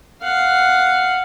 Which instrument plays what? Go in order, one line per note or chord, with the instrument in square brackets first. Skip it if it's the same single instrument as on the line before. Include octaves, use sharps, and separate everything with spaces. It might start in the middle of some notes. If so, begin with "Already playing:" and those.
[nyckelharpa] F5 F#5